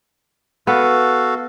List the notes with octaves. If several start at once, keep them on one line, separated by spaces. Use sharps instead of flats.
B3 F#4 A4 F5